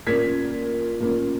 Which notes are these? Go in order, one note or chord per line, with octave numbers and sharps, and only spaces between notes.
A#2 A#3 C#4 G#6 B6
A#2 A#3 C#4